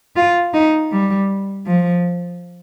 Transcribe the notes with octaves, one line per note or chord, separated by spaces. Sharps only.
F4
D#4
G3
F3